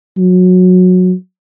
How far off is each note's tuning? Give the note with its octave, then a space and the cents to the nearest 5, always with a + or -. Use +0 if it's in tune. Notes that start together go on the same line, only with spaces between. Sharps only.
F#3 -20